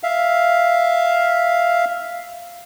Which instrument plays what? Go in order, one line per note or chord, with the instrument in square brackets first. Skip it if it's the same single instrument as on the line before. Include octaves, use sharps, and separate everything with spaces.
[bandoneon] E5 F5